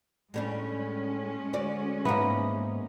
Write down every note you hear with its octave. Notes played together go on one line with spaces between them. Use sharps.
A2 G3 G#3 C#4 D4
D2 F#4 D5
G#2 D#3 A#3 B3 E4